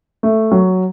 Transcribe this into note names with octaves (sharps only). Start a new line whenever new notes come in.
A3
F#3